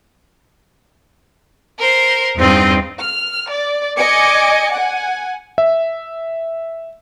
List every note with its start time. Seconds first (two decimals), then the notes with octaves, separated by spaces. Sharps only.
1.79 A#4 C5
2.36 E2 G2 C4 D#4 F4 D#5
2.99 F6
3.51 D5
3.98 D5 D#5 G#5 D6 C#7
4.73 F#5 G#5
5.58 E5